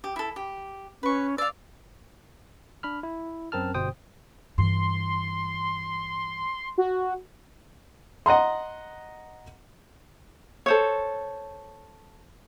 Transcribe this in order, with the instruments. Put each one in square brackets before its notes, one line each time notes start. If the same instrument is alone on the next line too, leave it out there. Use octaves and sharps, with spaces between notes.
[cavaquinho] G4
E4 A4
G4
[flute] C#4 [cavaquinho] B4 C#6
[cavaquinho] D5 F5 [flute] E6
[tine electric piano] D4 B5 F6
E4
F#2 C4 A#4 A5 F6
G1 B2 C5 G5 D#6
[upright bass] G2 E3 [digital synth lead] C6
[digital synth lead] F#4
[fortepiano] D#5 F#5 A#5 C6
[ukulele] A4 C5 C#5